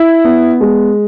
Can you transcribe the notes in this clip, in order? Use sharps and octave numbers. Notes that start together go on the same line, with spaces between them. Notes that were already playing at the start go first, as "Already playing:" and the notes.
Already playing: E4
B3
G#3